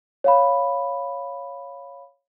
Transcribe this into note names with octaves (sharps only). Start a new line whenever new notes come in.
C#5 F5 B5